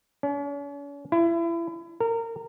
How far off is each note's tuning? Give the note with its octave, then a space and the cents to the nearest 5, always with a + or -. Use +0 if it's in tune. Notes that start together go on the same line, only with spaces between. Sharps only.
C#4 +45
E4 +30
A#4 -25